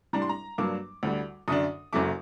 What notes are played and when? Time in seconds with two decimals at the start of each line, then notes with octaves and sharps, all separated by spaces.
0.13 A2 G3 D4 A#5
0.22 C6
0.29 A#5
0.58 G2 F#3 A#3 D4 D6
1.03 D2 D3 G3
1.48 F#2 D3 A3 D4 D#6
1.93 F#1 F#2 F#3 A3 D6